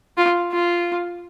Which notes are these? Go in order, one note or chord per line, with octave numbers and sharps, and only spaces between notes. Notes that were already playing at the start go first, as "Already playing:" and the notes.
F4
F4